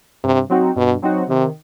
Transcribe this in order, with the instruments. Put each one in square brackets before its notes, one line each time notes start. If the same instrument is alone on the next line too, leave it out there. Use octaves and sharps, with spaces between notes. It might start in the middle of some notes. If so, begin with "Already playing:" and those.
[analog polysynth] G2 [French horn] C3
[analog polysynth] F#3 C4 D#4 F#4
[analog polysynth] G2 [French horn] B2
[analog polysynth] F#3 C4 D#4 F#4
[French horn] C3 [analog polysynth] D#3